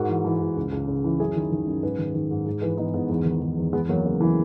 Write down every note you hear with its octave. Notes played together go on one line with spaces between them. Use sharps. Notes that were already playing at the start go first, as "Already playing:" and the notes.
Already playing: G#2 F#4 A#4
E3
E3
G#2
C#2
C#2
C#3
E3
F#2 E4 G#4
D#3
D#3
F#2
G#2 G#4 B4
D#3
D#3
G#2
G#2
E3 G#4 B4
E3 B3 D#4
G#2 B3 D#4
E2
D#3
D#3
E2
E2 G#3 B3
E2 F#3 A#3
C#3 F#3
E3 G#3